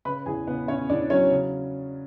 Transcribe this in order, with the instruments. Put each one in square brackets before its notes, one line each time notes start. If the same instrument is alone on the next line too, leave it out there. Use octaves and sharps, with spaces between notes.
[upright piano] C#3 B4 B5
E2 G#4 G#5
C#3 B3 B4
C#3 C#4 C#5
E2 D4 D5
F#3 C#4 C#5
C#3